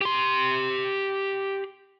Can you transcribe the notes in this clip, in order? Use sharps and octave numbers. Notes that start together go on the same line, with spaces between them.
G4 C6